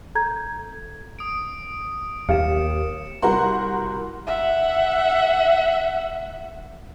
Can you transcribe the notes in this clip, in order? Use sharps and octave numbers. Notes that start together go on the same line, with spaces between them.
A4 A#5 G6 G#6
D#6 D7
D#2 G4 F5 C#7 E7
C2 F#4 A#4 F#5 C6
E5 F#5